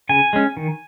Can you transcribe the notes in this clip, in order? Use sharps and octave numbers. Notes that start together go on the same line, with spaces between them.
C#3 G#5
G#3 C#4
D#3